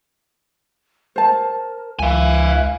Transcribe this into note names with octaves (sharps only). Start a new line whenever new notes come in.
A#4 C5 A5
C#2 E5 F5 G#5